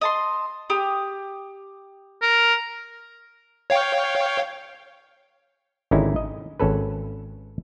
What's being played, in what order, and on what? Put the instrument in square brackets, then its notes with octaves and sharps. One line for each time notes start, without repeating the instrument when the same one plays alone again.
[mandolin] D#5 A5 C6
G4 D#6
[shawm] A#4
[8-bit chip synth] C#5 F5 G5
[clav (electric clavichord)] G#1 D3 C#4 D#4 E4
D#5
G#1 C#4 A4 B4